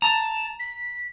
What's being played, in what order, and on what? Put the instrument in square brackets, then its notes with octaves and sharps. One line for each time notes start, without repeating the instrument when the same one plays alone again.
[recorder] A5 [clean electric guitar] A#5
[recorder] B6